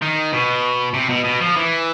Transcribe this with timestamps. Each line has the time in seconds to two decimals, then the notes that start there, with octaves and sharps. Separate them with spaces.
0.02 D#3
0.33 B2
0.94 C3
1.09 B2
1.25 B2
1.41 F3
1.57 E3